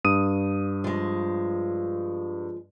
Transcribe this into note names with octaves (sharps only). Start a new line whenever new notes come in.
G2 D#6 D#7
F3 G#3